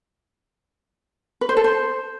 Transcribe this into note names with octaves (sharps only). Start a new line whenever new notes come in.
B4
C5
A4
C5